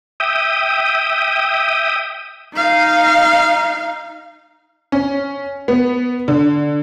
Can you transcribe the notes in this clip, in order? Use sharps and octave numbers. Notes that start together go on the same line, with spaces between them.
E5 G5 D#6
D#4 F5
C#4
B3
D3